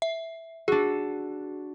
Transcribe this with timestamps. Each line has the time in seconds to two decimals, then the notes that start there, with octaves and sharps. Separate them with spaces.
0.02 E5
0.68 D4 F#4 G#4